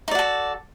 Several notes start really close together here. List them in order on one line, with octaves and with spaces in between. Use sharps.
D#4 D5 F#4 A4